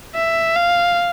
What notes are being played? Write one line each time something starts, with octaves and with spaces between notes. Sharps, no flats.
E5
F5